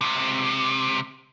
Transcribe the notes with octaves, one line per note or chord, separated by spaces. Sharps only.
C#2 C3